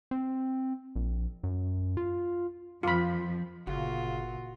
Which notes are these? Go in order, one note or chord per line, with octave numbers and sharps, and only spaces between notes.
C4
A#1
F#2
F4
F2 F3 F4 B5
G1 A#2 C#3 F4 F#4